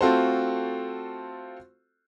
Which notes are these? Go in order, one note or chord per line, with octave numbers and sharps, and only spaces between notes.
A3 C4 F4 F#4 A4 C5